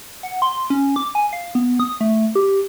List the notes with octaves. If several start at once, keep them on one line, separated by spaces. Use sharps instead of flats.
F#5
C6
C#4
D6
G#5
F5
B3
D#6
A3
G4